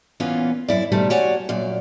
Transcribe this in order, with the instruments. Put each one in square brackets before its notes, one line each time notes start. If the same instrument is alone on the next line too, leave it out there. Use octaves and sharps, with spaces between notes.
[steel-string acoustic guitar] A#2 E3 B3 C#4 F4
F#2 E4 D5
B2 D#3 F3 G3 A3
F#4 G4 C#5 D5 F#5 G#5
F#2 A#2 D5